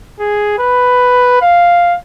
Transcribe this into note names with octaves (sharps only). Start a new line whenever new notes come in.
G#4
B4
F5